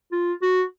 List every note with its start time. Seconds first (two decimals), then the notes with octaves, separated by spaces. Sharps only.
0.12 F4
0.42 F#4